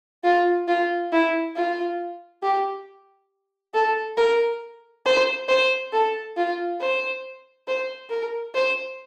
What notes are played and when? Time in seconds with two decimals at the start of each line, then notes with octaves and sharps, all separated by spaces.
0.24 F4
0.68 F4
1.12 E4
1.56 F4
2.43 G4
3.74 A4
4.17 A#4
5.06 C5
5.48 C5
5.93 A4
6.37 F4
6.80 C5
7.67 C5
8.10 A#4
8.55 C5